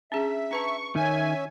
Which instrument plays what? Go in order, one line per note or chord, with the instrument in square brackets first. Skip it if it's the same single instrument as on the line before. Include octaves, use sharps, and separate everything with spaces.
[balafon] C#4 D4 G#4 [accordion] E5
[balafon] D4 B4 A5 [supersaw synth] C#6
[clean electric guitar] D#3 [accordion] C#4 E5 [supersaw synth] G#5